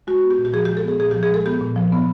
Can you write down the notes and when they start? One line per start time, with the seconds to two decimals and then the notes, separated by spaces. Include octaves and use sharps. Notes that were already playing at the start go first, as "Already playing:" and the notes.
0.07 G#3 F#4
0.23 B3
0.31 G4
0.38 A#2
0.45 G4
0.53 F3 G#4
0.65 G#3 G4
0.77 A4
0.84 B3 G#4
0.99 A#2 G#4
1.11 F3 G4
1.23 G#4
1.31 G#3 A4
1.46 B3 G4
1.61 A#2
1.76 F3
1.92 B3